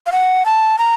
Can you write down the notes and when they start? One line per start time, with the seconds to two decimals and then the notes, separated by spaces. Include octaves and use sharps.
0.06 F5
0.12 F#5
0.46 A5
0.79 A#5